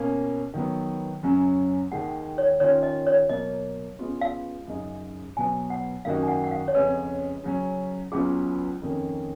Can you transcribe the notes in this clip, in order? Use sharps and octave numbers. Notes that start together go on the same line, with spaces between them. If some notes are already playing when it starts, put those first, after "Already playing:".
Already playing: B2 A#3 C#4 F5
D#3 F#3 B3
F#2 C#3 F#3 C#4
D#2 D#3 G#3 F#5
C#5
D#3 A#3 C#4 F4 C#5
D#5
C#5
B2 F#3 A#3 D#5
C#3 G#3 B3 F4
F5
F#2 C#3 G#3 D#4
B2 F#3 B3 G#5
F#5
F#2 D#3 A#3 D#4 F#4 F5
G#5
F#5
F#5
F5
C#5
F2 C#3 G#3 C#4 B4
C#3 F#3 C#4
C#2 C#3 F#3 B3 F4 G#4
F2 D#3 A#3 C#4